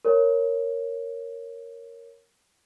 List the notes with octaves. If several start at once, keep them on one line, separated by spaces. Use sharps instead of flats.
A#4 C#5